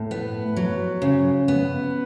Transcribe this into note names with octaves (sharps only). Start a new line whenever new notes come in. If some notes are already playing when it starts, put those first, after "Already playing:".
Already playing: A2
B3
F#3
C#3
B3